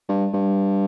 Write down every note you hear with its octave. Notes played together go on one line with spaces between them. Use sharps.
G2
G2